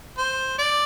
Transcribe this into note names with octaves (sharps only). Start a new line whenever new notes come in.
C5
D5